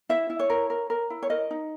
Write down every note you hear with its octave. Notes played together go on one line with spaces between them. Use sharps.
E4 E5
E4
C#5
A#4
A#4
A#4
E4
C#5
A#4 D#5
D#4